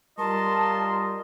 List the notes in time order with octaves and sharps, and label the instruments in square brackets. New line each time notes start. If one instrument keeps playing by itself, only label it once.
[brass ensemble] G3 F4 [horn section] A#4 C6 [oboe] D#5 [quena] A5